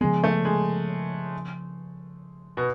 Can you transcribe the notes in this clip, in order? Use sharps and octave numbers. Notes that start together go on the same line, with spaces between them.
C#3 F3 G#3 B3
A3
G#3
B2